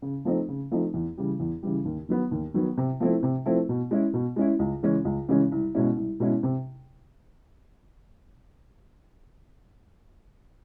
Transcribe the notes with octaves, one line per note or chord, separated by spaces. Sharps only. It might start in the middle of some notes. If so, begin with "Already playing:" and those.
C#3
F3 A3 C4 D#4
C#3
F3 A3 C4 D#4
E2
C#3 E3 G3
E2
C#3 E3 G3
D#2
D#3 F#3 B3
D#2
D#3 F#3 B3
C3
F3 A3 C4 E4
C3
F3 A3 C4 E4
B2
G#3 C#4 E4
B2
G#3 C#4 E4
C#2
C#3 E3 G#3 C#4
C#2
C#3 E3 G#3 C#4
C2
B2 G#3 C#4 E4
C2
B2 G#3 C#4 E4
C3